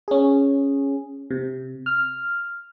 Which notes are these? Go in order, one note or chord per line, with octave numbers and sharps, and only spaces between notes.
C#4 G#4
C3
F6